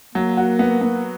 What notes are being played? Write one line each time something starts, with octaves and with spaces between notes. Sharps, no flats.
F#3 A#3
F#4
B3
B3